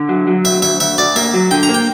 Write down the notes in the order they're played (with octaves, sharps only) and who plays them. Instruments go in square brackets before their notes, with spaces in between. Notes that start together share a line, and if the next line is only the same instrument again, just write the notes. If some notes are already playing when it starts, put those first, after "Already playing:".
Already playing: [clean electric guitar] D3
F#3
F#3
[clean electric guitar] D2 [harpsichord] E5
[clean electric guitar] D2 [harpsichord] E5
[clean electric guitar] D2 [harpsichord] E5
[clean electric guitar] D2 [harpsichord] D5
[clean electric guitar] A#3 [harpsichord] E5
[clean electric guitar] F#3
[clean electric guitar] D3 [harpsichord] G5
[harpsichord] A#5
[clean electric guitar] A#3
[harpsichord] G5